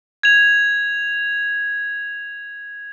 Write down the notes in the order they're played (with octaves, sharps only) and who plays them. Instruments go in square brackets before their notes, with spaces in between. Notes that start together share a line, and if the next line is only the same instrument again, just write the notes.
[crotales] G#6 F7